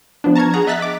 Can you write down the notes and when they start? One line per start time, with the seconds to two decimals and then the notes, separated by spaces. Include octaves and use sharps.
0.24 F3 B3 D4
0.35 A5 A#5 C#6 F6 G#6
0.54 G#4 F#5 A#5
0.67 D#5 E5 F#6 A6 B6
0.82 D6